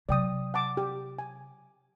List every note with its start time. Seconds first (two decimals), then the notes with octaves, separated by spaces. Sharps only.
0.09 C3 F#3 D5 G5 D#6
0.54 F#5 A5 D6
0.77 G4
1.19 G#5